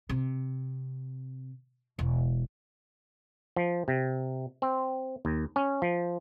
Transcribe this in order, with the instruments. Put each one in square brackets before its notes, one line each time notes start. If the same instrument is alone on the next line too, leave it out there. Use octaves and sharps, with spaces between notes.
[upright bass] C3
E1
[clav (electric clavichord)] F3
C3
C4
D#2
C#4
F3